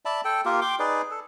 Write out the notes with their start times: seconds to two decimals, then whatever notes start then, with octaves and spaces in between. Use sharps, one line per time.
0.05 D5 E5 A5 B5
0.25 A4 G5
0.45 A#3 F4 G4 A#4
0.61 G5 C6 D6
0.79 D#4 G#4 B4 D5
1.11 A4